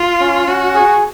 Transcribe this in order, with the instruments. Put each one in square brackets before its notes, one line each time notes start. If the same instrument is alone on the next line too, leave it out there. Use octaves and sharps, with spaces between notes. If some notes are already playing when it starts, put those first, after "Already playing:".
Already playing: [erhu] F4
[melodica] C#4
[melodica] C#4 [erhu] F#4
[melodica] G#4